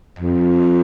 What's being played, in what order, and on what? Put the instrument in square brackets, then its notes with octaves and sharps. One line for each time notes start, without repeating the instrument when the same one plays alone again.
[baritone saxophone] F2